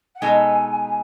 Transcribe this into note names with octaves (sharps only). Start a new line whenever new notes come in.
F#5
B2 G#3 D#4 A4 G#5